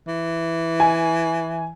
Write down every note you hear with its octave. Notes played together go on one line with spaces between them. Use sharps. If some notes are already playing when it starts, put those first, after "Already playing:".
E3
G#5